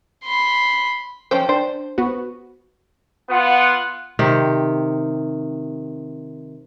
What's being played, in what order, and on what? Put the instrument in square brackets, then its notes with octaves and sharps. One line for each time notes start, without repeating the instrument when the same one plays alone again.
[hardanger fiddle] B5 C6
[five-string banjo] F3 C#4 C5 [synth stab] G5
[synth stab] D4 [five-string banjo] C5
[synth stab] B3 F#4
[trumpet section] B3 F4 F#5
[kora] C3 D#3 G4